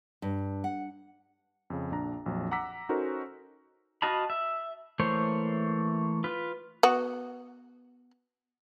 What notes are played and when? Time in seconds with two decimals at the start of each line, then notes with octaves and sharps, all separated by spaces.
0.22 G2
0.64 F#5
1.70 F2 C#3
1.92 A#1 D4 A#5
2.26 A#1 F2 F#3
2.51 F#5 A#5 D6 E6 B6
2.89 C#4 D#4 F#4 A4 A#4 C5
4.02 F#4 D#5 F5 A5 B5
4.30 E5
4.99 E3 A3 A#3 C5 C#5
6.24 F4 B4
6.83 B3 F#4